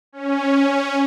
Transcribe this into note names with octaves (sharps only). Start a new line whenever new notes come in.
C#4